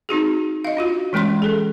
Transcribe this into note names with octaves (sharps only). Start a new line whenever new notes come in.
C4 D#4 F#4 G#4
D#5 F5
D4 F4 F#4
E3 G#3 A3 C#4 C6
G#4 A4